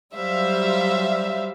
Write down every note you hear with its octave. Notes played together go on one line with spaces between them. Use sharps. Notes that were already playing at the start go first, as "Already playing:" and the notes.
F#3 G3 C5 E5 F5